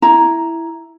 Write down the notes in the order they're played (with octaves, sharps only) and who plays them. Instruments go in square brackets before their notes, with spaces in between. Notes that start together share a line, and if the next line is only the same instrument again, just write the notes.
[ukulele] E4 A#5